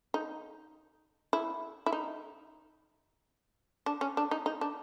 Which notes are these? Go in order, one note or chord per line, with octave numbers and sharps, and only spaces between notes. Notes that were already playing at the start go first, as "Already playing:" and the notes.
D#4
E4
E4
D#4
D4
C#4
D4
D#4
D#4
D4